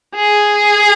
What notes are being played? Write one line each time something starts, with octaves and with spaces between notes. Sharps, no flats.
G#4